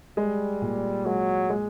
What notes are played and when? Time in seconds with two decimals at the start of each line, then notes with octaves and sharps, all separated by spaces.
0.17 G3 G#3
0.62 A#2
1.05 F#3 G#3
1.49 G#3